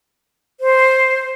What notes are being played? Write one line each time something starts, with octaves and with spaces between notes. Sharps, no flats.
C5